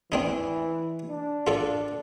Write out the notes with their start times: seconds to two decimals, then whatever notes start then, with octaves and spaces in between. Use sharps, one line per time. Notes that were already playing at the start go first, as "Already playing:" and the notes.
0.12 E3 C4 D4 D#4
1.09 D4
1.47 F4 A4 D5